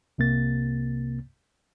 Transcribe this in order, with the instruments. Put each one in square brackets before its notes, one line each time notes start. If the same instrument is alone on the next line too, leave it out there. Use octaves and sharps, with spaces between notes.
[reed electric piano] C2 C3 A#3 A6